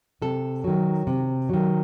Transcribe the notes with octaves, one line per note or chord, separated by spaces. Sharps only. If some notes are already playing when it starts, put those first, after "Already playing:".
C3 A4
D#3 F#3
C3
D#3 F#3